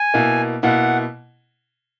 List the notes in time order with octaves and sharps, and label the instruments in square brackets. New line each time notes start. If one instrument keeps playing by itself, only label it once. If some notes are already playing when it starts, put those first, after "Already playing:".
Already playing: [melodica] G#5
[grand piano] B2 A#3 E4
[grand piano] B2 A#3 E4 [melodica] F#5